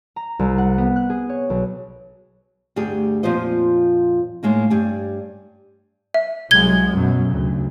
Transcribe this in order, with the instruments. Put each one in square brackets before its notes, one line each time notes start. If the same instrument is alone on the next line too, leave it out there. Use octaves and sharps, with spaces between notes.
[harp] A#5
C2
F#5
B3
F#6
G#4
C#5
B1
[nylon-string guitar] D2 G2 G3 G4 G#4
F2 A#2 F3 F4 C5 D#5
A2 G#3 A#3 D#4
G2 G3 G#5
[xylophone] E5
[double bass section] C2 F#3 G#3 [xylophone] G#6 G7
[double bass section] F#2 B2 F#3
D2 C#3